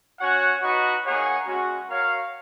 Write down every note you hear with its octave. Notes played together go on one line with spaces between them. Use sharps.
C#4 F#4 C#5 F#5
D#4 F#4 B4 D#5 F#5
A#3 D#4 G#4 C#5 F#5
G#3 C#4 F#4
F#4 A#4 C#5 F5